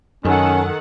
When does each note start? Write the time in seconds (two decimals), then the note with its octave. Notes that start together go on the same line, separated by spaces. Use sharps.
0.25 F#2 D#3 C#4 A4 F#5